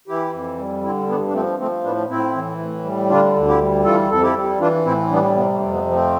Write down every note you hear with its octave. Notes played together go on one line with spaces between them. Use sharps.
E3 E4 G4
F2
G3
D3 C4 E4
G2 B3 D4
D4
F3 A3 C4
F3 A3 C4
A2 B3 D4
A2 C4 E4
E3
A2
G3
D3 D4 F4
D2
E4 G4
G3
E3 F4 A4
F2 A4
E4 G4
G3
E3 D4 F4
A2 C4 E4
G3 B3 D4
C3 B3
A3
F2
B3
F3
A3 C4